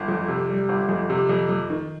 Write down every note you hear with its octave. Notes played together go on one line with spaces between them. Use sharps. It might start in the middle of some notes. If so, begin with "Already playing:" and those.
Already playing: G1
F2
C3
G3
G1
F2
C3
F2
F2
D#3